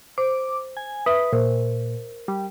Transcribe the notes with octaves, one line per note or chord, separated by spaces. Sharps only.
C5 D6
G#5
B4 E5 D#6
A#2 A#4 C5
G3